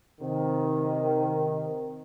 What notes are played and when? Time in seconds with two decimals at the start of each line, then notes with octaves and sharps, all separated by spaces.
0.21 C3 D#3